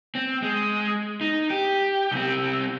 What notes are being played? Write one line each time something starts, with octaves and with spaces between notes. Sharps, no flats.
C4
G#3
D#4
G4
C2 C4